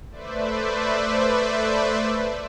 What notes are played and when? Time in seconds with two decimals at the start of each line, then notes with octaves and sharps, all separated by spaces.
0.11 A3 B4 C5 D5 E5